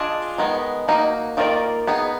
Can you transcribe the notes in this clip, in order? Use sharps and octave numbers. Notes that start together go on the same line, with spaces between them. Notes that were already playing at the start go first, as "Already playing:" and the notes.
Already playing: D4 F4 G#4 D#5
D#3 G#3 B3
A#3 D#4 F#4
D#3 A#3 F4 A#4 D5
B3 D#4 G#4